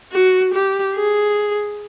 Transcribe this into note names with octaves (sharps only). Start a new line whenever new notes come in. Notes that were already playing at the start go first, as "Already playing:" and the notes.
F#4
G4
G#4